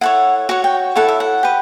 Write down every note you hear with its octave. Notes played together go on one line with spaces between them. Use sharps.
E4 A4 C#5 F#5
F#4 C#5 F#5
G5
E4 A4 C#5 F#5
E5
F#5
G4 B4